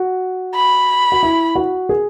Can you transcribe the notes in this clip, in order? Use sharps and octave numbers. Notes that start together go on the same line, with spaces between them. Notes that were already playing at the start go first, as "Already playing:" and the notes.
Already playing: F#4
B5
F#4
E4
F#4
G#4